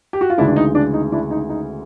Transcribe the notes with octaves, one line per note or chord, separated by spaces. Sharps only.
G4
F#4
F4
D2 C#3 E3 G#3 D4 E4
D4
D#4
D4
D#4
D4 E4
D#4
D#4